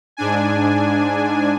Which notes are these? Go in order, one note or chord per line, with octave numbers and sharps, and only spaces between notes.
G#2 D4 G#5